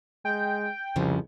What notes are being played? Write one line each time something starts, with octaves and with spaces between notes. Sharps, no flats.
G#3 G5
C2 F2 C#3 F3